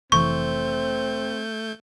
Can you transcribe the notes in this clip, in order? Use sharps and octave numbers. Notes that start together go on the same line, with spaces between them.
F1 E3 A3 C4 C#6 G6